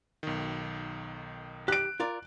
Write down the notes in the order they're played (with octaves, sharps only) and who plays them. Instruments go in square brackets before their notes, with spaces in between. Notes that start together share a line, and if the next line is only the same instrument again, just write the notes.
[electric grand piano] B1 D#3
[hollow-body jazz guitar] G4 [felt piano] F#6 D7
[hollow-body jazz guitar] F4 A#4 D5